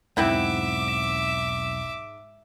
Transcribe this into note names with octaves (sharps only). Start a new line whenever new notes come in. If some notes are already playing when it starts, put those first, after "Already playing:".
B1 E2 G#2 C4 E4 E5 F#5 D6